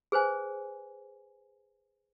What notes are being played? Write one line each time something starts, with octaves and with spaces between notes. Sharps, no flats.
G#4 B4 C5 G#5